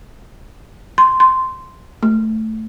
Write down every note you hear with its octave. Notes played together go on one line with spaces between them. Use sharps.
C6
C6
A3